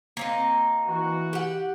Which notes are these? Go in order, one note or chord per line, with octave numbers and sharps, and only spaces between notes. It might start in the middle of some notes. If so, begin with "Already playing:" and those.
A#3 C4 D#4
E3 F#4
G4 F#5